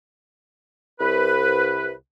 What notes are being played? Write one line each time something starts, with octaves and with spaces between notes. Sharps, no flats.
C2 B4